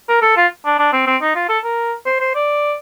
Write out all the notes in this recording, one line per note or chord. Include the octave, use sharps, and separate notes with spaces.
A#4
A4
F4
D4
D4
C4
C4
D#4
F4
A4
A#4
C5
C5
D5